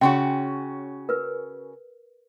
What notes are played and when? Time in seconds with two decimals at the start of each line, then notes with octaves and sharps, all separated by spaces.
0.01 C#3 C#4 F#4 G5 C6
1.09 A#4 B4